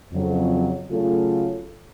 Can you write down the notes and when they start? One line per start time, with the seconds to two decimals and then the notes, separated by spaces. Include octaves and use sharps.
0.13 F2 C#3 F#3
0.89 C#3 F#3 A3 F4 A4